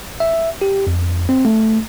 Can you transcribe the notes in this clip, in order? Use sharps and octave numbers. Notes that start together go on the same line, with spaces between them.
E5
G4
F2
C4
A3